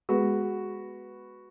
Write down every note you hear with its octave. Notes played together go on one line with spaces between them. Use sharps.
G#3 B3 F#4 G#4 B4